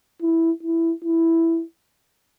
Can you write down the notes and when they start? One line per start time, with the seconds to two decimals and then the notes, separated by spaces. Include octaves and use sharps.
0.22 E4
0.63 E4
1.04 E4